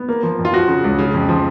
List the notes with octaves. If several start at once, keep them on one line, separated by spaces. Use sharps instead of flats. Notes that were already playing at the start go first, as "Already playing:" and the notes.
Already playing: B3
A#3
F3
F2
F4
F3 F#4
C#3
C#2
C#3
F2
F3